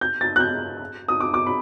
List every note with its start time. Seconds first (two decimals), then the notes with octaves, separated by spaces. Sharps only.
0.01 G6
0.21 A6
0.36 F#6
0.40 G6
1.08 D#6
1.20 D6
1.34 D6
1.47 B5